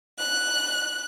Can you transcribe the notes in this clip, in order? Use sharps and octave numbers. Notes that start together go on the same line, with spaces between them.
F#6